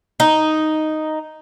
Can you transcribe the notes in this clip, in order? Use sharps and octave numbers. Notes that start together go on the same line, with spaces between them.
D#4